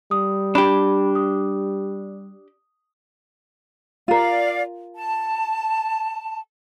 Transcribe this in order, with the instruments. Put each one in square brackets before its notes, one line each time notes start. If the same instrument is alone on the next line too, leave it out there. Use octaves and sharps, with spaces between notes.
[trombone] G3 [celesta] D#6
[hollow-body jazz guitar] D4 G4 [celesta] B5
[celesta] D#6
[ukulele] F4 A#4 [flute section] D5 F5
[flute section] A5